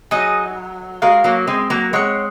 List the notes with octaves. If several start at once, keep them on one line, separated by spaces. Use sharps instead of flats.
F#3 D#4 G#4 D#5
G#3 F#4 A#4 F5
F#3 A#3
G#3 C4
F#3 A#3
G#3 C4 C#5 F#5 C#6